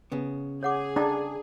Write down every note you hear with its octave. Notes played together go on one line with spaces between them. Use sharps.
C#3 B3
G#4 C#5 F#5 D6
D4 D5 G5 A#5